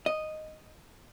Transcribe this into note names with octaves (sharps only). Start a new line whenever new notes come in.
D#5